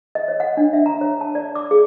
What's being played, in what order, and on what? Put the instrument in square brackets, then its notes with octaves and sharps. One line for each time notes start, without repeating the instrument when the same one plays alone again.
[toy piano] D#5
C#5
F#5
D4
E5
A#5
C#5
A5
D5
D6
G#4